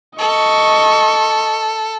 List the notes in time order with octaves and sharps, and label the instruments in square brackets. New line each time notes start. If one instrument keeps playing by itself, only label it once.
[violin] A4 [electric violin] D#5 C#6